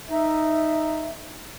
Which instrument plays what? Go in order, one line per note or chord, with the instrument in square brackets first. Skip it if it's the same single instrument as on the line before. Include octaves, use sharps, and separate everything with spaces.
[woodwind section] D#4 E5